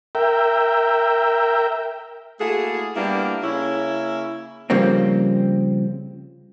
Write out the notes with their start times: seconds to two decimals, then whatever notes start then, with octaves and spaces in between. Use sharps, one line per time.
0.15 A#4 E5 G5
2.40 A3 A#3 E4 F#4 G#4
2.96 G3 A#3 B3 D4 E4 G4
3.43 C#3 A#3 C#4 E4
4.70 C#3 F3 G3 A#3 C4